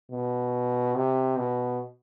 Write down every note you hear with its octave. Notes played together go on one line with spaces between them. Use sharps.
B2
C3
B2